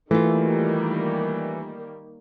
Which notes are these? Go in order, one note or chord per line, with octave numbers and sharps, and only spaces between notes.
D#3 E3 G3 A3 A#3 F4